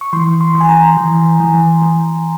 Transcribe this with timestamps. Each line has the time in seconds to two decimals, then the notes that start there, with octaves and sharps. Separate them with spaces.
0.01 C#6
0.13 E3 C6
0.41 C6
0.55 E3
0.61 G#5
0.69 A#5
0.97 E3
1.40 E3
1.82 E3